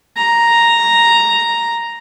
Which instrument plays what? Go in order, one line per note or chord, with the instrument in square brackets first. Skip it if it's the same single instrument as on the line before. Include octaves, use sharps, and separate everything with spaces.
[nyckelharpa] A#5